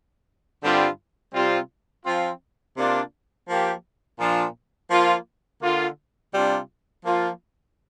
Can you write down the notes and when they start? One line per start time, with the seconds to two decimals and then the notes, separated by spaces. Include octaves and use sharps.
0.63 G2 D3 G3 C4 F4
1.35 C3 G3 C4 F4
2.05 F3 C4 F4
2.76 C3 A#3 D4 F4
3.48 F3 A#3 G4
4.20 A#2 F3 D4 F4
4.90 F3 A#3 F4
5.62 D3 A#3 F4
6.34 C3 G3 D4 F4
7.05 F3 A#3 F4